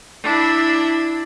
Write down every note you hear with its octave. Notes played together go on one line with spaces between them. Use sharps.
D4 E4